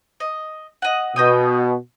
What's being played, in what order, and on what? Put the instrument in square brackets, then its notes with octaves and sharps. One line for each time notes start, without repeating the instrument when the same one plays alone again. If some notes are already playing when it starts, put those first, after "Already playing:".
[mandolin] D#5
D#5 F#5
[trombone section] B2 [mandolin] D#5 G5 D#6